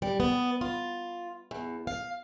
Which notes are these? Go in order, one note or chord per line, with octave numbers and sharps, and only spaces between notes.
G3
B3
F4
E2
F5